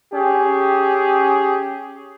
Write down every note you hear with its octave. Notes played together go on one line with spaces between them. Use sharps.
C#4 G4 G#4